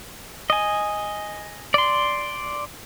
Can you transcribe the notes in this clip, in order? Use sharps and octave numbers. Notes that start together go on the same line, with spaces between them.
D#5 G#5
D5 C6